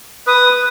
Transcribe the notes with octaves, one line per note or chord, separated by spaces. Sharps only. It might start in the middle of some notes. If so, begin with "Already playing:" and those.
B4 D#6